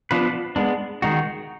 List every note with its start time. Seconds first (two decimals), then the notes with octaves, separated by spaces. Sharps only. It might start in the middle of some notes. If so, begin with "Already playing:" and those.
0.11 F3 B3 D4 F4 B4
0.56 G#3 B3 D4
1.02 D#3 G#3 D#4 F#4